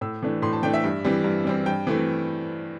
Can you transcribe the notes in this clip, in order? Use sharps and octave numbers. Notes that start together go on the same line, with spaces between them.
A2 E6
E3 A3 D4
A2 C6
A5
E3 A3 D4 G5
E5
G2
E3 G3 C4
G2
E3 G3 C4
G2 G5
E3 A3 C4